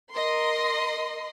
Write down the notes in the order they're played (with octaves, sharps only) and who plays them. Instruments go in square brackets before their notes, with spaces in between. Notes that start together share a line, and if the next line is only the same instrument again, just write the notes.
[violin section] A#4 D#5 C6